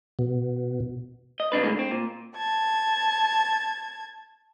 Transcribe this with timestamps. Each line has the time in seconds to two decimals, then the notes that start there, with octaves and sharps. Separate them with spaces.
0.19 B2
1.40 D#5
1.52 C2 C3 D4 B4
1.63 A2 D3 G#3
1.79 C4
1.91 A#2
2.36 A5 G#6